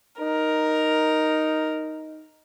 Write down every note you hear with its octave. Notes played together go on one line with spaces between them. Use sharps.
D#4 A#4